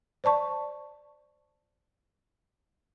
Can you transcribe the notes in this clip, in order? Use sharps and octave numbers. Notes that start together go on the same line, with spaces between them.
C5 D5 A5 C#6